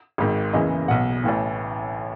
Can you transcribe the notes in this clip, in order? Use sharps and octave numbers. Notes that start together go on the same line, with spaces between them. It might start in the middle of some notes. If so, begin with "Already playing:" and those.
G#1 G#2 D#3
F#1 E2 C#3 E3 D#5
B1 B2 F#5
A1 A2 E3